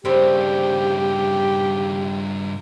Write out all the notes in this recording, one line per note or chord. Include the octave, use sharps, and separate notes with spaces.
G2 C#3 G3 C4 G4